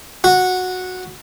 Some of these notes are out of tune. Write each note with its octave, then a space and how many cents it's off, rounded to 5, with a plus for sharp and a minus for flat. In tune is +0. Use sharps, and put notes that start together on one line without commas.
F#4 -10